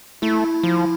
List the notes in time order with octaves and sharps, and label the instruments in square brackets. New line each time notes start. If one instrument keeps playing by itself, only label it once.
[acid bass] A3 [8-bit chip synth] E4
[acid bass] F3